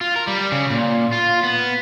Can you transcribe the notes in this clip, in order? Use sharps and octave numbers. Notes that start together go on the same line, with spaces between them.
F4
A#4
G3
C#3
A#2
F4
B3